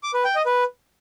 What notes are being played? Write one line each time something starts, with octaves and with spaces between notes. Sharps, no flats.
D6
B4
G5
D#5
B4